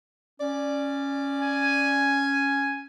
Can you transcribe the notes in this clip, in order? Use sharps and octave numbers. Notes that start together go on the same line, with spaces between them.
C#4 D5
G#5